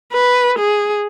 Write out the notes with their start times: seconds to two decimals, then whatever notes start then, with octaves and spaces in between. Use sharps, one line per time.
0.13 B4
0.59 G#4